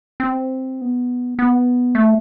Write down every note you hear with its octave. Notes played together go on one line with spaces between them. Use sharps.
C4
B3
B3
A3